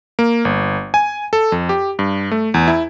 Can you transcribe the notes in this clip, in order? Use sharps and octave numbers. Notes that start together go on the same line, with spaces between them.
A#3
G1
G#5
A4
F2
G4
G2
A3
E2
E4